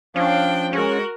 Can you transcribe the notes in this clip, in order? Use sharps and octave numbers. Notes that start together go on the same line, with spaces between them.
F3 C#4 D4 F5 G5
G#3 C#4 F#4 G#4 A#4